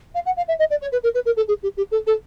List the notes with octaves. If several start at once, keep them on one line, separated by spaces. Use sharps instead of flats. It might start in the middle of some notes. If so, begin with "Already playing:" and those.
F5
F#5
F5
E5
D#5
D5
C#5
B4
A#4
B4
A#4
A4
G#4
G4
G4
A4
A4